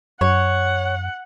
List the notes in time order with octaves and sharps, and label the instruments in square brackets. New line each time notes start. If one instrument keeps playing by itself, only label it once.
[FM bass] F#2 [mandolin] C#5 [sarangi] F#5